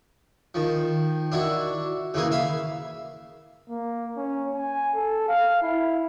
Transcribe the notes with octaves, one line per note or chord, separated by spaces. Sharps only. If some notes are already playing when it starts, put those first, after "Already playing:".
D#3 F3
D4 E4 F#4
C#3 E3 A#3 G#4
E5 F5 B5
A#3
C#4
G#5
A4
F5
E4